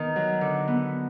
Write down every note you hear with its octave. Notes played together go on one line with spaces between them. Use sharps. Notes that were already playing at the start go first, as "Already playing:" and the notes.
Already playing: D#3 B3
F#3
D3
B3